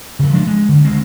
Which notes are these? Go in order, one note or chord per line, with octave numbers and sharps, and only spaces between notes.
C#3 F#3
F3 G#3 D4
G#3
D3
D2 G#3 C4